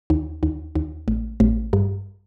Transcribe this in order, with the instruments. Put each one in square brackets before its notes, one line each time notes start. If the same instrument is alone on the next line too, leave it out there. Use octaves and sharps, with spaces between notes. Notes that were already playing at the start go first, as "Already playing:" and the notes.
[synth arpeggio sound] D#2
D#2
D#2
A1
A1
G2